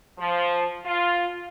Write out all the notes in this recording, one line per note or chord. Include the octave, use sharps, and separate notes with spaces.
F3
F4